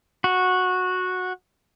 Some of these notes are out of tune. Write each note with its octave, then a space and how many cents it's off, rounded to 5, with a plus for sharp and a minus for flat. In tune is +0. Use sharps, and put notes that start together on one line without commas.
F#4 -10